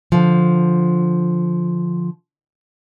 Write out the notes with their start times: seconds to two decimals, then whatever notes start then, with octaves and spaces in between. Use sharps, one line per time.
0.12 D3 F3